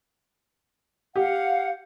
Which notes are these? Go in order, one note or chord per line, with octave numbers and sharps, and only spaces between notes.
G4 F5 F#5